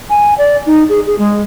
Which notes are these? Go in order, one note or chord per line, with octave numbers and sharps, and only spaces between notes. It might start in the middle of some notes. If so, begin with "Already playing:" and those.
G#5
D5
D#4
G#4
G#4
G#3